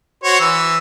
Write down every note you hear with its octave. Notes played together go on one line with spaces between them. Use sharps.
F#4 C5 C#5
E3 E6